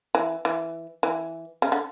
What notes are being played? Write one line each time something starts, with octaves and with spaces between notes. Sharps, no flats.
E3
E3
E3
C#3
D3